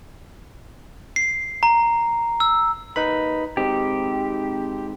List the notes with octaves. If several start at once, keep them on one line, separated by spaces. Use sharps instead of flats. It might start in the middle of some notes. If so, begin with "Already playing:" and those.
C7
A#5
E6
D#2 D#4 B4 B5
D#3 G#3 C4 D#4 G4